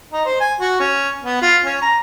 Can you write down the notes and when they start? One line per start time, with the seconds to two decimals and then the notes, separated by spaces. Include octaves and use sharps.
0.13 D#4
0.25 C5
0.40 G#5
0.61 F#4
0.80 C#4
1.24 B3
1.42 F4
1.65 C#4
1.82 A#5